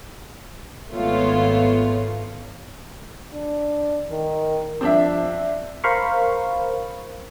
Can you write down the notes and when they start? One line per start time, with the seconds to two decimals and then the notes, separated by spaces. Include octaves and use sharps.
0.91 G#1 A3 B3 F4 C#5
3.33 D4
4.11 D#3
4.81 F3 C4 D4 E5
5.84 A#4 C5 F5 B5 C#6